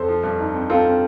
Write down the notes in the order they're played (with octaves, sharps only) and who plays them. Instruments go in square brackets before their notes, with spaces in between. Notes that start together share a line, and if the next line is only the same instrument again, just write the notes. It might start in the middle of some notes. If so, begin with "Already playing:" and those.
Already playing: [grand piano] F2 [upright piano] A4 C5
[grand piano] F3
G2
D#4
C4
[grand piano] C4 [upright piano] F4 A4
[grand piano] C4